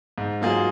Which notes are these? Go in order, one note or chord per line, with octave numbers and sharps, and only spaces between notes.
G#2
F#3 A#3 F4 G#4